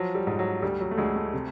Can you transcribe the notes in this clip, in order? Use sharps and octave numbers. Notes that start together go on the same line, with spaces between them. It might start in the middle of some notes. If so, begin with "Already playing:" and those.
Already playing: F3 F#3
G3
G#2
F#3
D2 G3
F#3
A3
D2 G#3
A3
C3